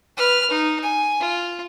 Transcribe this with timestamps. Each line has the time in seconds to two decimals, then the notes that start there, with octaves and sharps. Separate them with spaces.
0.17 B4 F6
0.50 D#4
0.82 G#5
1.20 F4